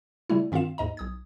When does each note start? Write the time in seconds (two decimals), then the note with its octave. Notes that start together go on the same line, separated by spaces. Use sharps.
0.30 C#3 G3 A3 E4
0.52 G2 D#3 C4 F4 F5 E7
0.78 D#2 G#2 D#5 A#5
0.97 B1 D#6 G#6